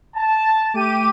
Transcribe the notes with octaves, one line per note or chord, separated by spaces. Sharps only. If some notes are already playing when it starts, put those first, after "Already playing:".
A5
A3 G4 D6 D#7